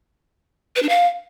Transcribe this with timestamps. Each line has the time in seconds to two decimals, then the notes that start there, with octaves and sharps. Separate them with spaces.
0.76 B4
0.83 D4
0.89 F5